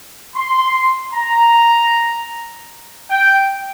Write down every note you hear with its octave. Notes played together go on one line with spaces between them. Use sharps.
C6
A#5
G5